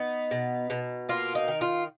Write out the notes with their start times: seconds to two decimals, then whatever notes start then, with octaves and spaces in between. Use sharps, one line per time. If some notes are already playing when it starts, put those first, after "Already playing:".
Already playing: B3 D#4
0.31 B2
0.70 B2
1.09 A#3 F4
1.35 D#4
1.48 D#3
1.61 F4